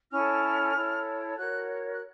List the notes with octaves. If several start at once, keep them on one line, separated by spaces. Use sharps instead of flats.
C#4 E4 A4 C#5 F6
E4 A4 C#5
F#4 A#4 C#5 F#6
F#6